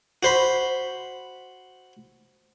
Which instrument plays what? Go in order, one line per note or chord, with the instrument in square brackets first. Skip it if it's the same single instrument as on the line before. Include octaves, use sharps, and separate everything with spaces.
[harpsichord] F#4 C5 B5